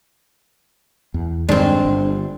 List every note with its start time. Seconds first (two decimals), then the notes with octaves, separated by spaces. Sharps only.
1.14 E2
1.49 G2 D#3 G#3 C4 D4
1.85 G1